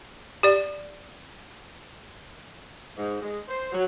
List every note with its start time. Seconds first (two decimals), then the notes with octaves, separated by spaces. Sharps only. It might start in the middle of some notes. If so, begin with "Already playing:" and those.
0.43 G4 D5
2.97 G#2
3.22 G#3
3.48 C5
3.72 F#3